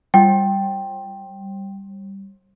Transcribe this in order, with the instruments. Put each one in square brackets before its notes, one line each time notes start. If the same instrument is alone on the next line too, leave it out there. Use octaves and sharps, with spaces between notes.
[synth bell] G3 [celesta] G5